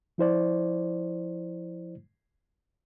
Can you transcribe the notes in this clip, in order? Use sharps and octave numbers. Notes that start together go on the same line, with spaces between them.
F3 E4 C5 D5